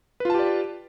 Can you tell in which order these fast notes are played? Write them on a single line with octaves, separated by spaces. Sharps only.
B4 F4 A5 G4 D5